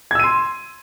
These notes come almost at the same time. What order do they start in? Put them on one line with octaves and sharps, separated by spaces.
G#6 E6 D#7 C6